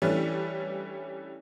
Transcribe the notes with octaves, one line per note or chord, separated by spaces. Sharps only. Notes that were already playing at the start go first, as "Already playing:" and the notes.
E3 G3 A3 C#4 D4 B4